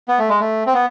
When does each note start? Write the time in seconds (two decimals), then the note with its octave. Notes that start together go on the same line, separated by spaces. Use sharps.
0.08 B3
0.19 A3
0.29 G#3
0.40 A3
0.66 C4
0.74 B3